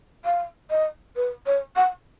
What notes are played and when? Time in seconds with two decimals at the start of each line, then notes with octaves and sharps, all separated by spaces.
0.25 F5
0.70 D#5
1.16 B4
1.46 C#5
1.76 F#5